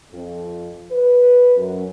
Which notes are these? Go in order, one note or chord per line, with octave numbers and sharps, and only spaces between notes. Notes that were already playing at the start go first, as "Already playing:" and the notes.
F2
B4
F#2